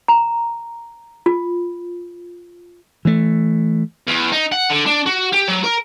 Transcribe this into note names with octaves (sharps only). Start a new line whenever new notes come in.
A#5
F4
E3 A3
E2
D#4
F#5
D3
D4
F#4
G4
F#3
A#4